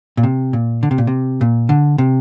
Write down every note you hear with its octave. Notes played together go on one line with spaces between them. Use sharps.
A#2
C3
A#2
D3
C3
A#2
C3
A#2
D3
C3